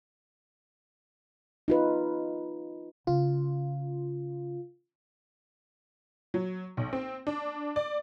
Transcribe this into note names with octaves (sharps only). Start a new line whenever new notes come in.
D#4 F4 B4
C#3 F4
F#3
B1
C4
D4
D5